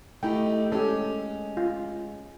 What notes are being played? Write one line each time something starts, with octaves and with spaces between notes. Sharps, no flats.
A3 D#4 E4 G4 G5
G#3 C#4 G4 A4
F4